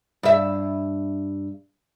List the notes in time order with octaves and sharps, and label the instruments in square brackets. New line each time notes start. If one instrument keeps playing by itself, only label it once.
[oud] G2 E5